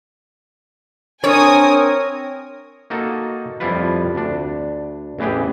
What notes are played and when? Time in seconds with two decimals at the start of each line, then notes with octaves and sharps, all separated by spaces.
1.24 C4 D4 A#4 C#5 G#5 D#6
2.90 A#3 D#4 F#4 A4
3.60 F2 F3 G3 E4 F4 B4
4.15 D2 D4
5.18 A1 E2 E3 G4 G#4